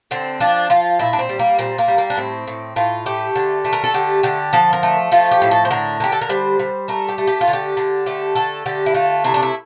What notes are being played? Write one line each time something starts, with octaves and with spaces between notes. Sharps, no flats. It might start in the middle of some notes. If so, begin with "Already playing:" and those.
D3 C4
F3 D4
F3 F4
A#2 E4
D4
C4
G3
A#3
A#2 C4
A#3
G3
A#3
D4
A2 C4
A2
A2 F4
A3 G4
D3
A3
A#4
A4
D3 G4
D3 G4
F3 A4
A#4
A3
F3 F4
G4
A2
A4
C5
D3 A#4
D3 G4
A4
A#4
G3 C5
G3
A3 A#4
G4
A3
G4
F4
D3
G4
D3
A3 G4
D3 A4
D3 G4
E4
A3 F4
C3 E4
D4
E4